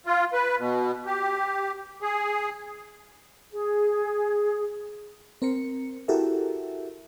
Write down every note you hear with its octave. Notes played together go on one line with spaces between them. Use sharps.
F4
B4
B2
G4
G#4
G#4
C4 A#4 C5 C#7
E4 F#4 G4 A4 A#4 E5